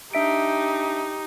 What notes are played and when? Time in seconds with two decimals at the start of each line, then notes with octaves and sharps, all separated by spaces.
0.14 D4 D#4 G4 E5 D7